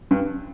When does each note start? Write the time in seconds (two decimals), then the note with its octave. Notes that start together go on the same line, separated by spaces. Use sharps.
0.11 G2